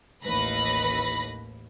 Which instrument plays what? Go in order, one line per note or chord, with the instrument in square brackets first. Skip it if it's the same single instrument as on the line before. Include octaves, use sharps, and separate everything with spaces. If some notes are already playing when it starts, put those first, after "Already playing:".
[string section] A1 D#2 B4 B5 A#6